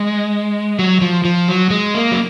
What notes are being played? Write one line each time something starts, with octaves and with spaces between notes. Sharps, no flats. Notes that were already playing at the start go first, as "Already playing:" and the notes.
Already playing: G#3
F#3
F3
F3
F#3
G#3
A#3
F#3